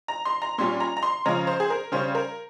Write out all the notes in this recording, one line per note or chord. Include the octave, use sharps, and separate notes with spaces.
A#5
C6
A#5
A#2 G3 C#4 C6
A#5
A#5
C6
C#3 F3 G#3 C#4 A#5
C5
G#4
A#4
C#3 G3 C#4 C5
A#4